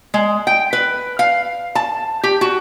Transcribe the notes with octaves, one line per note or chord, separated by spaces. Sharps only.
G#3
G5
B4
F5
A5
G4
F#4